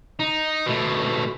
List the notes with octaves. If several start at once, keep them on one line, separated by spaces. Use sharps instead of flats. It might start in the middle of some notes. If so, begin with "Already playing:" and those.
D#4
B2 A3